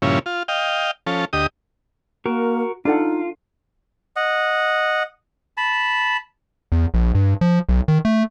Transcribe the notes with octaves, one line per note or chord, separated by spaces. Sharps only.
G2 A#2 C#3 F3 C#4 E4
F4
D#5 F5 G5
F3 C#4 A4
D2 G4 D#5 D#6
A#3 F#4 A#4
D4 D#4 F4 A4 F#5
D#5 F#5
A5 B5
E2
A#1
G2
F3
B1
D#3
A3